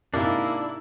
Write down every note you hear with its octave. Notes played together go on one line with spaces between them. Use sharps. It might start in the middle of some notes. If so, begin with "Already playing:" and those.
G#2 C3 A#3 D4 E4